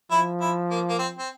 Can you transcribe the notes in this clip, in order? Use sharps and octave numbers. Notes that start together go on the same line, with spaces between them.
F3 E4
E4
A#3
A#3
C4
C4